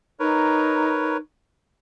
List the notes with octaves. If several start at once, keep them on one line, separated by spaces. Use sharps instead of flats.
D#4 A#4 B4 C#5